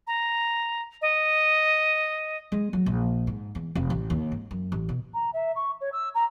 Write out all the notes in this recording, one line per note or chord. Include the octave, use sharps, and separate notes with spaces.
A#5
D#5
G#3
F#3
A#1
G#2
E2
F1
A1
D#2
G#2
F#2
A1
B2
A#5
E5
C#6
C#5
E6
A#5